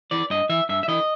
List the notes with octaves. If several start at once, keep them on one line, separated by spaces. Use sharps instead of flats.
E3 D5
G2 D#5
E3 E5
G2 E5
E5
E3 D#5